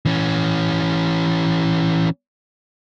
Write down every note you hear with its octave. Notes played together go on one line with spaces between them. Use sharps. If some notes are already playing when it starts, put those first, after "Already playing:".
E3 C#4